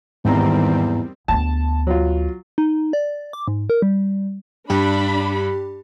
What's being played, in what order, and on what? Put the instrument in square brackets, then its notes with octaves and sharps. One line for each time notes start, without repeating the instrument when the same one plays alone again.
[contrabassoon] E2 [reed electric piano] G#2 A#5 [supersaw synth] D#3 G3 C4
[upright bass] D2 B3 [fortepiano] A5
[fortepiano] F#3 F4
[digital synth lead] D#4
D5
D6
G#2
A#4
G3
[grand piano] G2 [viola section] D4 B5 [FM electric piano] G4